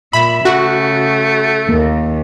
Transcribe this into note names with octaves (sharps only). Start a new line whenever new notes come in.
A#2 E5 B5
C#3 A3 F#4
D#2 A#3